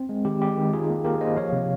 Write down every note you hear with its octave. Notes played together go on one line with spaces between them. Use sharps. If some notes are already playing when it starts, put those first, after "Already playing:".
Already playing: C4
G#3
D#3 G4
G#3 G4
D#3
D#4 F4 G#4
A#3
A#3 G4 A#4
A#3 C5 D#5
F3 C#5 F5
C3